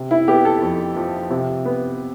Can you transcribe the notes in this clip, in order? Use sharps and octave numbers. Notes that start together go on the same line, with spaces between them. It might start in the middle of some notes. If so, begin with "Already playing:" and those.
Already playing: C3
E4
B3 G4
A4
F2
F3
C3
B3